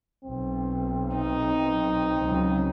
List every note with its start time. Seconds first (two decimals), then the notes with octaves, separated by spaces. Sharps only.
0.25 B1 C4
1.17 D#4
2.20 C#2 C#3 F#3